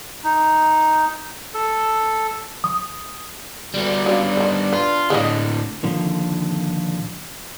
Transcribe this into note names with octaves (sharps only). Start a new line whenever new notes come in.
D#4
A4
D#6
D2 G3 B3
F#3 C#4 D4 F4
D#3 C5
F4 B4
A2 D3 G#3 B3 D#5
A#2 D3 D#3 F3